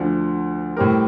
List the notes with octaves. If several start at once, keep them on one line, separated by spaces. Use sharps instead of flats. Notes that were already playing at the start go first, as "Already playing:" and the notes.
Already playing: D2 D3 F3
A2 G3 C4 G4 A#4